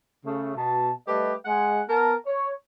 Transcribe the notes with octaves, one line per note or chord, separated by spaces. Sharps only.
C#3 A3
B2 A5
G3 A3 G4 A4 B4 D#5
G#3 F#5 G#5
B3 A#4 A5
C#5